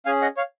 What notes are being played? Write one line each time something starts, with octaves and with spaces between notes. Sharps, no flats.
C#4 G#4 F5 G#5
D#5 F#5
C#5 F5